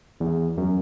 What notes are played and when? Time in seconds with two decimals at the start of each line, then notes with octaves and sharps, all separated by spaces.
0.20 E2
0.57 F#2